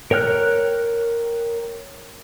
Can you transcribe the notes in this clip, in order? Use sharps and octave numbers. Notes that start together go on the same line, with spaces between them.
A#4 C#5 G5 F6 F#6